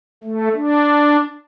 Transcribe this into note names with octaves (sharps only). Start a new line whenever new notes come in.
A3
D4